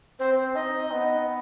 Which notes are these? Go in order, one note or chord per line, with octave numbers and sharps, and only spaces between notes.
C4 C5
D#4 D#5
B3